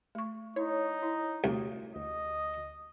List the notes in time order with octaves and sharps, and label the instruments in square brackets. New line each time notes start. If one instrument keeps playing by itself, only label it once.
[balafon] A3 C#6
[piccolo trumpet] D#4 [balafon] E4 [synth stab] C#5
[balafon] E4
[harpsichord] C2 [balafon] A3 F#4
[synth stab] D2 [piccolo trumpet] D#5